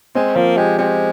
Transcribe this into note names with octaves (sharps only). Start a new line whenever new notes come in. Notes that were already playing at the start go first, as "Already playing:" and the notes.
G#3 C4
F3 A#3
G#3 G4
G#3 C4